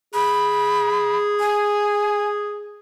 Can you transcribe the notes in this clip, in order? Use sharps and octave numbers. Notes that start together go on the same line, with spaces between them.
G#4 B5
G#5